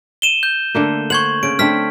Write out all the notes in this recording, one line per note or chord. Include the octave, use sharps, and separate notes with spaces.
D#7 E7 G7
G6
D3 A3 A#3
C5 F#5 C#6 G#6 F#7
C#3 D7
D3 A3 C4 F6 B6